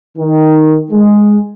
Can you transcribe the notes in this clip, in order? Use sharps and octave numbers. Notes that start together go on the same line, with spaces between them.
D#3
G#3